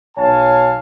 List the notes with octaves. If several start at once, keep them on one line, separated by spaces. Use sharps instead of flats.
B1 C#5 F5 G#5 A5